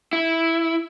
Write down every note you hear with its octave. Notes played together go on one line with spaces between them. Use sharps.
E4